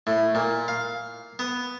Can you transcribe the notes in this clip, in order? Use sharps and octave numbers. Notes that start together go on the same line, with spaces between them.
A2
A#2
F5
B3